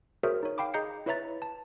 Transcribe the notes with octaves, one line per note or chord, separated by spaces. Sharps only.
F#4 G#4 A#4 C5 C#5 E5
D#4 C#5
F5 G5 B5 D6
G#4 D#5 A#5 G6 C7 C#7
E4 B4 C#5 E5 A#5 A6
A5